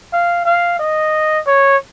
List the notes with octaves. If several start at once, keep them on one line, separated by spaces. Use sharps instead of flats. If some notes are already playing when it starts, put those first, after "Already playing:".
F5
F5
D#5
C#5